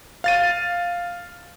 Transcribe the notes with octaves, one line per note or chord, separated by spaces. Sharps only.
F5 A6 D#7